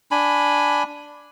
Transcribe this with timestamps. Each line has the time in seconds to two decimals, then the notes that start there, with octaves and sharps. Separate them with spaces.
0.11 D4 G#5 B5